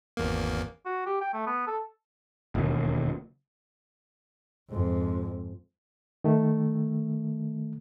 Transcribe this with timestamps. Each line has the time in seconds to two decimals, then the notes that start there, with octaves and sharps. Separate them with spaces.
0.17 G#1 E2 A#3
0.86 F#4
1.07 G4
1.21 G5
1.33 A3
1.47 B3
1.67 A4
2.55 E1 D#2
4.70 F2 G#2
6.24 D#3 A3